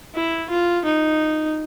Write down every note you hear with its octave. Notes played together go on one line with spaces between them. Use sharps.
E4
F4
D#4